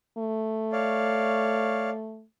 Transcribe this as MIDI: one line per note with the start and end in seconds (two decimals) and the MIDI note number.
0.18 2.24 57
0.72 1.90 73
0.72 1.90 74
0.72 1.90 77